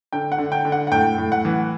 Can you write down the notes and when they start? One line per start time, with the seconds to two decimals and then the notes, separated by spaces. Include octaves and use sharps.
0.13 D3 G5
0.32 F#5
0.38 D3
0.52 G5
0.65 D3
0.72 F#5
0.87 F#5
0.92 A2 G5
1.18 A2
1.32 F#5
1.45 E3